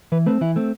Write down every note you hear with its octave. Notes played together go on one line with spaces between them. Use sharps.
E3 B4
A3 C4 B4
E3 E4
A3 C4